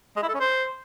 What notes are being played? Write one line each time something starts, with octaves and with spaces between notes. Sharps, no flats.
G#3
E4
A4
C#4
C5